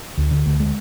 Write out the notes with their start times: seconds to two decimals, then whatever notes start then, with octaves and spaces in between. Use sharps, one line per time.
0.18 D2
0.31 D3
0.46 D2
0.60 G#3